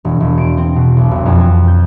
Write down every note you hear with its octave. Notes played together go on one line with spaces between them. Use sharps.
E1
E1
D7
C4
B2
B1
E1
F2
G#5
G6